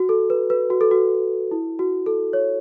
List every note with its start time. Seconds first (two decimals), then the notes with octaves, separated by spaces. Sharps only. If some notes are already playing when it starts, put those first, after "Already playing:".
Already playing: F#4
0.09 A4
0.30 B4
0.50 B4
0.70 F#4
0.81 A4
0.91 F#4
1.51 E4
1.79 F#4
2.06 A4
2.33 C#5